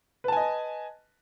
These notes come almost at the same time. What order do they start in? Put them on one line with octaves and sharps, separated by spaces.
B4 A5 G#5 D#5